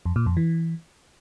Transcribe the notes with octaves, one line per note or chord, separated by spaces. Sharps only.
F2
A#2
F2
E3